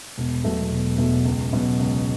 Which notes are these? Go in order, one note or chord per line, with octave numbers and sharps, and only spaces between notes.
E1
E2 B2 F#3 A3
E1
E2 B2 F#3 A3
C#2
B2 F#3 C#4
C#2